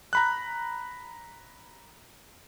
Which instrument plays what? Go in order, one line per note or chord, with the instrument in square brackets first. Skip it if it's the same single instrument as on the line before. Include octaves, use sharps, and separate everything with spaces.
[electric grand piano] A#5 B5 F#6